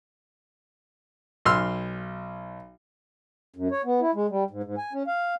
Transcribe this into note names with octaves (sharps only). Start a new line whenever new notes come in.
B1 C6 E6 F6
F#2
C#5
B3
E4
G#3
G3
G#2
G#2
G#5
C#4
F5